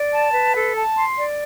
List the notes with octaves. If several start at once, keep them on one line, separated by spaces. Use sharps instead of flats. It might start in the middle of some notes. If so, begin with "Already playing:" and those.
Already playing: D5
A5
B4
A4
A5
C6
D5